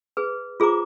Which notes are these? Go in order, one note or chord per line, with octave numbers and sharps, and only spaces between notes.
G#4 B4
F4 G#4 C5 A#5 D6